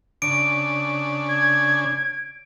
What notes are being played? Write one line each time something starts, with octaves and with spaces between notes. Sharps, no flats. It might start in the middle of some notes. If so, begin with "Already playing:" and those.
C#3 D4 D7
G#6